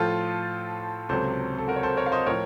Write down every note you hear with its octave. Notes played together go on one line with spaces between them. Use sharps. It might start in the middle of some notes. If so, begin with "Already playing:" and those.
Already playing: A2 F3 F4 A4
C#2 C3 F#3 A4 C5
A4
F#4 A#4
C#5
A4 C5
A#4 C#5
F5
C5 D#5
A2 F3 A#4 C#5